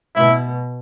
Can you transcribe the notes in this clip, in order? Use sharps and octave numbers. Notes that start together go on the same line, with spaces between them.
B2 E4